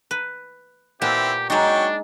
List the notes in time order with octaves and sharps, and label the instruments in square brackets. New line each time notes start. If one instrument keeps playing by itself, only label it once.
[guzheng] B4
[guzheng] A#2 B3 A5 [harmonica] C4 E4 [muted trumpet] G4
[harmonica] F#3 G5 C#6 [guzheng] G#3 D#4 [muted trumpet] D4